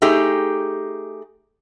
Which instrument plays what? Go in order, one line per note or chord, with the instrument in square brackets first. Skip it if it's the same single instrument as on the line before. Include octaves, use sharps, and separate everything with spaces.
[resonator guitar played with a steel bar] A3 D#4 G4 G#4